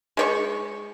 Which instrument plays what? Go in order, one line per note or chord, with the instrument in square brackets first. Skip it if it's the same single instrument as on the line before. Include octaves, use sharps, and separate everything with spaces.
[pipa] G#3 C#5 C#6